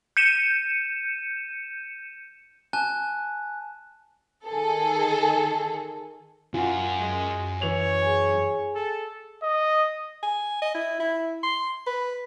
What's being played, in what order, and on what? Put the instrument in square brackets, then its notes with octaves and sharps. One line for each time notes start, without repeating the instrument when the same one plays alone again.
[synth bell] G6 C#7 D#7 E7
[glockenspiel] G#5 A5 F#6
[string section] D#3 G#4 A4
[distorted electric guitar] F#2 [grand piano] F4 F#5 [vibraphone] G#5
[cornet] G#3
[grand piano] E3 F7 [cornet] C#5
[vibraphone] G#4 G#5
[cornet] A4
[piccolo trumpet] D#5
[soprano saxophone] G#5
D#5
E4
E4
C6
B4